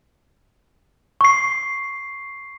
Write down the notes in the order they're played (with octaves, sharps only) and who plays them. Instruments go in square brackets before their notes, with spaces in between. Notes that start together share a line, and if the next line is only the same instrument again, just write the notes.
[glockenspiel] C#6 C7